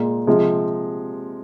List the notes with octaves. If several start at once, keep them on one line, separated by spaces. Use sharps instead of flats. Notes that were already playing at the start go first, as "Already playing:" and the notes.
Already playing: A#2 G#3
C3 F3 G#3